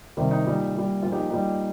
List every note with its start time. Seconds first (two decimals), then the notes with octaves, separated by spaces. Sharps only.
0.17 C3 D#3 G3
0.31 D#4
0.45 A#2 G3
0.75 A#2 G3
1.03 A#2 F3 F4
1.12 D#4 G4
1.30 A#2 G3 D#4 G4